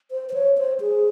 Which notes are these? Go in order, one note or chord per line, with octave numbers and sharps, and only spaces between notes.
C5
C5
C#5
C5
G#4